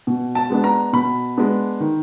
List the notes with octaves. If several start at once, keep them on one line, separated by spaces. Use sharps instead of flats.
B2
A5
G#3 B3 D4
A#5
B2 B5
G#3 B3 D4
D#3